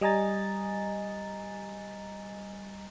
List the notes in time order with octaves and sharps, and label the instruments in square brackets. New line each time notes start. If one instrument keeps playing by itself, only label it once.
[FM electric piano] G3 D#5 G#5 A#5 A6